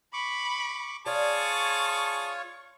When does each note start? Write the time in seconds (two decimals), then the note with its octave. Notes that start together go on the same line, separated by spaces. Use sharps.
0.13 B5 C#6 D6
1.06 F4 G#4 C#5 D5 A5 C#6